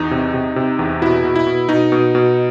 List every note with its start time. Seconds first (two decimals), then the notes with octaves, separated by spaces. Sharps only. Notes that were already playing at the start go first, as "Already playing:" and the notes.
Already playing: E2 D#4
0.11 C3
0.34 C3
0.56 C3
0.79 E2
1.02 B2 E4
1.24 B2
1.36 E4
1.47 B2
1.69 B2 D#4
1.92 B2
2.15 B2